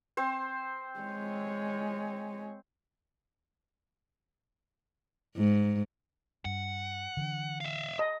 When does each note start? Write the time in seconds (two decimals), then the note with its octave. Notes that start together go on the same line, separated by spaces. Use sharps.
0.17 C4 C5
1.00 G#3 C#5
5.37 G#2
6.45 G2 F#5
7.17 D3 E3 D4
7.61 E5 F5
7.99 D#5